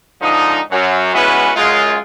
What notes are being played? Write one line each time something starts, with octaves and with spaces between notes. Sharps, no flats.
G#2 D3 F3 D#4
F#2 F#3
E3 G#3 B3 C#4 F#4 B4
F#2 G#3 F4